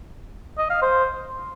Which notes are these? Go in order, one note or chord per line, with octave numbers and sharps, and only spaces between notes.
D#5
F5
C5